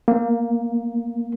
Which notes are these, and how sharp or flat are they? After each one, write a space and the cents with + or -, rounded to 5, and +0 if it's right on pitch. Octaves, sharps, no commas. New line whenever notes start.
A#3 +5